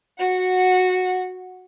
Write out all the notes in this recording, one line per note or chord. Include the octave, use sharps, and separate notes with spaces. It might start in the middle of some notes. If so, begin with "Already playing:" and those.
F#4 F#5